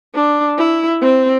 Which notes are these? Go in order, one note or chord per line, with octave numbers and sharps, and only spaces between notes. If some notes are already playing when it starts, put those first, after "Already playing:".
D4
E4
C4